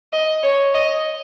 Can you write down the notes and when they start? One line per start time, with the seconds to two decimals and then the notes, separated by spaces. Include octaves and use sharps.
0.13 D#5
0.43 C#5
0.74 D#5